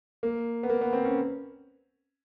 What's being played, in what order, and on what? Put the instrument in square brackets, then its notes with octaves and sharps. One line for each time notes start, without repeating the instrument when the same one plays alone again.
[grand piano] A#3
B3
A#3
B3
C4
C#4